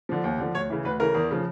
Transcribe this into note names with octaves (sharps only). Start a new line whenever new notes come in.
D3 F3
D#2
D3 F3
D2 C#5
C#3 E3
D2 B4
C#3 E3 A#4
E2
C#3 F3